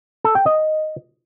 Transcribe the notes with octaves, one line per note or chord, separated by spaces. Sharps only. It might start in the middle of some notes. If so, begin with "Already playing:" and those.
A4
G5
D#5